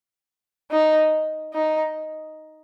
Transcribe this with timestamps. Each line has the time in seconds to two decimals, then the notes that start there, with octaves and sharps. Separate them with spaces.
0.71 D#4
1.54 D#4